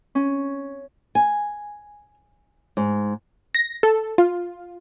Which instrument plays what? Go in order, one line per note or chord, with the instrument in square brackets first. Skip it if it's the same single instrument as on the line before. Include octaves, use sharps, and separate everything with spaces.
[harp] C#4
[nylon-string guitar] G#5
G#2
[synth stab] A#6
A4
F4